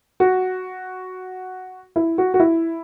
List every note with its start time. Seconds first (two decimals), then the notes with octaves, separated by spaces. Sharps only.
0.20 F#4
1.96 E4
2.18 F#4
2.34 F#4
2.40 E4